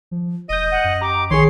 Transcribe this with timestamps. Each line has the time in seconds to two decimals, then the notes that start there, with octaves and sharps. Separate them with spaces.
0.11 F3
0.49 E1 D#5 D#6 G6 D#7
0.72 F#5
0.84 F#2
1.01 G4 A#5 D6
1.31 A#1 D#3 G#4 C#5 C6 C7